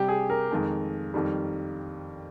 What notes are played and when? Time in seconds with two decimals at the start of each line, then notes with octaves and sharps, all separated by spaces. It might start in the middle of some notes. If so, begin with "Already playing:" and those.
Already playing: C3 G3 G4
0.08 G#4
0.30 A#4
0.51 F2 D#3 G#3
1.14 F2 D#3 G3